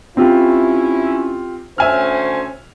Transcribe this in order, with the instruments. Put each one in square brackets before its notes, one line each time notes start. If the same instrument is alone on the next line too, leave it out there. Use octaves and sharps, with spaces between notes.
[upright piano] C4 F4 G4 [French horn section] C#4 E4
[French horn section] D2 C#4 C5 [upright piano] E5 G#5 F6